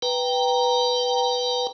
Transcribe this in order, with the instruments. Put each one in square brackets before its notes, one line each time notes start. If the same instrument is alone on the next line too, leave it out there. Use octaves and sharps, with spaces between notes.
[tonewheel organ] B4 G5 A#5